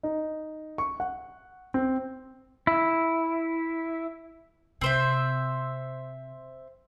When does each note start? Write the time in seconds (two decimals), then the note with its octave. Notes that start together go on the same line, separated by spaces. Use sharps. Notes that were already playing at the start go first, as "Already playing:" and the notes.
0.03 D#4
0.78 C#6
1.00 F#5
1.74 C4
2.67 E4
4.81 C3 C4 C5 E5